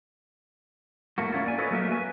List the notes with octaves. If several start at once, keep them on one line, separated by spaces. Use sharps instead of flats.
A2 A3 A#3 F#4
A#3 C#4 E4 F4
D5 G#5
F#4 A4 B4 C#5 D#5
F#3 A3 A#3 A#4 E5
F#4 B4 G#5